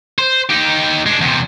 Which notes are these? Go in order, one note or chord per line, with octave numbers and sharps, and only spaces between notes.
C5
D#4 G4
G#3 D4
E2 C3